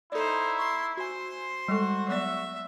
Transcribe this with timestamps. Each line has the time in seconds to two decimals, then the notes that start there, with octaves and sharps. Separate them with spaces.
0.12 D#4 E4 A4 C5 D5
0.59 C6 C#6
0.97 F#4 C5 G#5 C6
1.68 G3 G#3 F#4 A4
2.08 F#3 B3 D5 E5